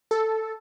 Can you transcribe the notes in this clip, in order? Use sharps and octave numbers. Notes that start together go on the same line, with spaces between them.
A4